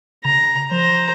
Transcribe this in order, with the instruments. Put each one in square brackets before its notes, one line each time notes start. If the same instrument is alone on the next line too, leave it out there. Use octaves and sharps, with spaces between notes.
[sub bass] C#3 [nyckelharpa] A#5
[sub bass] F3 [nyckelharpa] C5 A#5